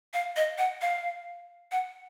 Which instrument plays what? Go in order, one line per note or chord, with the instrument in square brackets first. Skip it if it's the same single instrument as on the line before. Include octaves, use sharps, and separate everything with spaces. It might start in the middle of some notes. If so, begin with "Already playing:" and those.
[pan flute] F5
D#5
F#5
F5
F#5